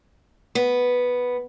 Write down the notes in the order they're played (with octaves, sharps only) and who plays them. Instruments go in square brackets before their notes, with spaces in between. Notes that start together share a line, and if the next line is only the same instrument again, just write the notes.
[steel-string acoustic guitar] B3